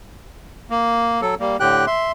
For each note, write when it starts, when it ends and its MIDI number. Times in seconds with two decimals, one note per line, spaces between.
0.70 1.21 58
1.22 1.35 54
1.22 1.35 69
1.40 1.57 55
1.40 1.57 58
1.60 1.86 45
1.60 1.86 50
1.60 1.86 67
1.60 1.86 79
1.60 1.86 90
1.87 2.12 76
1.87 2.12 84